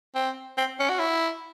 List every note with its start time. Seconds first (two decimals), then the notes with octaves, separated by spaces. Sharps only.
0.15 C4
0.57 C4
0.79 C#4
0.89 F#4
0.99 E4